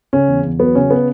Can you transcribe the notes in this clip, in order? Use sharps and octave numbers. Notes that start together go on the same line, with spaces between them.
C#3 C#4
E2
E2
F#3 B3
C#3 C#4
B3